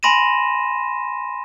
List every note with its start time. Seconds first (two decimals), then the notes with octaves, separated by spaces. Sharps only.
0.03 G#5 B5 C6 A#6 D#7 E7